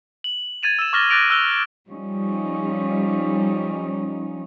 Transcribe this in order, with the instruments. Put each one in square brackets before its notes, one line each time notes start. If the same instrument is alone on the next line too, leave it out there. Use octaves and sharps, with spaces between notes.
[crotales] F#7
G#6 A6 D#7 F7
E6 E7
C#6 D6 F6 A6 A#6 G7
D6 F#6 A6 A#6 D7 F7
E6 F#6 G7
[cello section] F3 G3 C#4 D#4